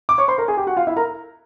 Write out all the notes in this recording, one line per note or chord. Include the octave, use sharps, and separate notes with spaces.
D6
C#5 C#6
C5 C6
A#4 A#5
G#4 G#5
G4 G5
F#4 F#5
F4 F5
E4 E5
A#4 A#5